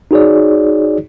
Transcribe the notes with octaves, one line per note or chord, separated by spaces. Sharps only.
D#4 F#4 G#4 C#5 D5